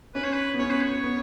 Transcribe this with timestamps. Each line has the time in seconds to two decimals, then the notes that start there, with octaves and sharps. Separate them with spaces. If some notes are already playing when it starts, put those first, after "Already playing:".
0.15 C#4 B4
0.24 C#5
0.33 B4
0.53 B3
0.59 C#4 C#5
0.70 B4
0.81 C#5
1.03 B3